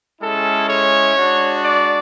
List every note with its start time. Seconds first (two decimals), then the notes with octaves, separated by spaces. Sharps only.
0.21 G#3 C#4 E4 A4
0.70 C#5
1.16 G#3 D4 F#4
1.63 D5